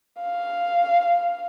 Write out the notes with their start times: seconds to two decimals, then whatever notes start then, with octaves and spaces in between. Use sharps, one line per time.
0.22 F5